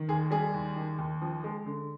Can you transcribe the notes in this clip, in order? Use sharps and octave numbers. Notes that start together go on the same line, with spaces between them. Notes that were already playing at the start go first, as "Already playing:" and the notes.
Already playing: D#3
D#2 G#4
G3 G#4
D#2
D#3
D#2
F3
G#3
D3